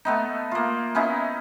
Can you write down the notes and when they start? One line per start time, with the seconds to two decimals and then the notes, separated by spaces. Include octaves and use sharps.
0.05 A3 B3 D#4
0.51 A#3 F4
0.95 B3 C#4 D#4 E4